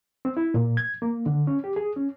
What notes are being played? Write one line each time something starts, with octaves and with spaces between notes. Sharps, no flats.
C4
E4
A#2
G#6
A#3
D3
C#4
G4
G#4
C#4